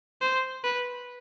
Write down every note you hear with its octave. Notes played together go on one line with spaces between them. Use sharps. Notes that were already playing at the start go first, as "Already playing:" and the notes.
C5
B4